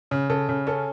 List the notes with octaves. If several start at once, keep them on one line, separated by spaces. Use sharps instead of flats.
C#3
C#3 A4
C#3
C#4 A4